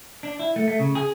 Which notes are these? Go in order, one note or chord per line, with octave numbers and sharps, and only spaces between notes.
D4
E4
A3
A3
C#3
G#4